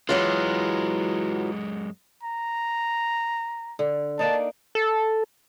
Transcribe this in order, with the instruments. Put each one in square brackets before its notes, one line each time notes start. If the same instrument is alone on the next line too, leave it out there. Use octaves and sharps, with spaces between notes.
[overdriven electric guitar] F#2 G#3 [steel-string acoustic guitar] E3 F#3 F4
[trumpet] A#5
[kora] D3
[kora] A#3 D4 D#4 [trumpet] A5
[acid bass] A4